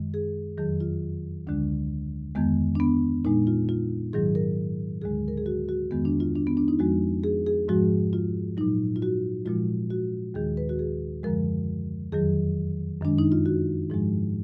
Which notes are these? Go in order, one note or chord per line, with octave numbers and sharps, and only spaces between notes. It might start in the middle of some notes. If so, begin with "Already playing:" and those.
Already playing: F#2 D#3 G#3
G#4
F2 D#3 F#3 G#4
F4
D2 D3 G#3 D4
F2 D#3 G#3 B3
D4
B3
A#2 G#3 D#4
F4
F4
G#2 D#3 F#3 G#4
A#4
D2 D3 G#3 G#4
A#4
G#4
F#4
F#4
F2 D#3 G#3 B3
D4
F4
D4
B3
D4
D#4
F2 F3 G#3 F#4
G#4
G#4
G#2 F3 G#3 F#4
F4
A#2 F#3 D#4
F4
F#4
A#2 F3 G#3 F4
F#4
D#2 D#3 G#3 G#4
B4
F#4
G#4
F#2 D3 F3 G#3 A#4
F2 D#3 F#3 G#4
F#2 D#3 G#3 D4
D#4
F4
F#4
G#2 F3 G#3